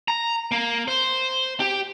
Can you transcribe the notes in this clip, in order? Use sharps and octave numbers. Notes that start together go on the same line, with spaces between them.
A#5
A#3
C5
G4